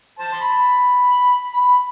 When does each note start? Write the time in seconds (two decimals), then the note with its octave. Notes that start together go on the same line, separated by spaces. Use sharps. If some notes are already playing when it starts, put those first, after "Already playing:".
0.19 C5 A5
0.32 C6
0.41 B5
1.54 B5